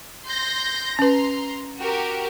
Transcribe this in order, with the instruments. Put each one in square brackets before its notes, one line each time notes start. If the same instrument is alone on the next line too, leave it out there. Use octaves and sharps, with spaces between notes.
[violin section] C6 G6 A#6
[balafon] C#4 B4 [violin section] A#5 C6
[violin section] F#4 G4 A#4